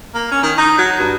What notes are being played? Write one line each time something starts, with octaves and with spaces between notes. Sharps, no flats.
A#3
C#4
D#3
D#4
F#3
G2